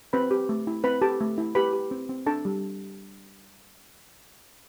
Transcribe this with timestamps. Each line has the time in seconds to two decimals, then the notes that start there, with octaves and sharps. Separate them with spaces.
0.13 C4 B4 B5
0.31 G4
0.49 A3
0.67 E4
0.84 C4 B4 B5
1.02 G4 A4 A5
1.21 A3
1.38 E4
1.55 G4 B4 B5
1.73 G4
1.91 C4
2.09 C4
2.26 D4 A4 A5
2.45 G3